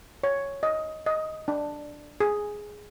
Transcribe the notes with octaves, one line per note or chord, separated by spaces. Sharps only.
C#5
D#5
D#5
D4
G#4